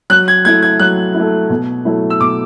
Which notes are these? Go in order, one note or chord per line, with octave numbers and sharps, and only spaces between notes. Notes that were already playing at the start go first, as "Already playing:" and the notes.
F#3 F#6
G#6
A3 E4 G#6
G#6
F#3 F#6
E4
A3
B2
F#3 A3 E4
E6
B2 D6